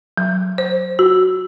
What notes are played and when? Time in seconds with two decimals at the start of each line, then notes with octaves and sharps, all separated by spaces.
0.17 F#3
0.58 C5
0.99 F#4